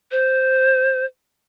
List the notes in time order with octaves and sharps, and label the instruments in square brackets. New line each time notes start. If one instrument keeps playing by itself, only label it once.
[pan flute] C5